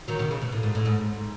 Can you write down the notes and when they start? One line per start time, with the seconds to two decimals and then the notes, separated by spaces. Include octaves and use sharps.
0.08 D#3 F#3
0.19 B2 D#3
0.31 C#3
0.42 B2
0.52 A2
0.63 G#2
0.75 A2
0.85 G#2